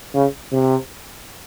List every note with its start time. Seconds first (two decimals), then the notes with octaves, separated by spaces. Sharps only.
0.14 C#3
0.52 C3